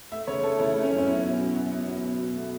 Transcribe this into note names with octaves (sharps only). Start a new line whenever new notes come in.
A3 E5
C#3 C#5
A3 A4
C#3 E4
A3
C#4
F#2
C#4
B3 E4
B2
F#3
B3
B3
F#3
B2
B2
A3